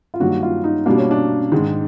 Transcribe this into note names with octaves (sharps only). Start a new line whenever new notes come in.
F4
G2 D#3 F#3 A#3 F#4
F4
D#4
B2 G3 A#3 D4
C#4
D4
G#2 D#3 G#3